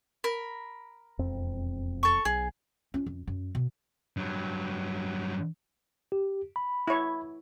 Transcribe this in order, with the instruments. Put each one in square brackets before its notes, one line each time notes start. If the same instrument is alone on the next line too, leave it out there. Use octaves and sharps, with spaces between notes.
[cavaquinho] A#4 B5
[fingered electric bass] E1 F2 C4
[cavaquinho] A4 C#6
[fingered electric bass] B1 [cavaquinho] G#4
[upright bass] C#4 F4
F2
F#2
B2
[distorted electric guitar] G2 F#3
[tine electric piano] G4
B5
[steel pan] E4 C#5